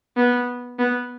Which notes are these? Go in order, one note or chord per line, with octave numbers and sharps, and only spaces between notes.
B3
B3